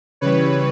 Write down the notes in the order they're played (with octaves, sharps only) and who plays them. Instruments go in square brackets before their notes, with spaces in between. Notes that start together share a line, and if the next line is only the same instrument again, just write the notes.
[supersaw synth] C#3 E3 G3 B4 C#5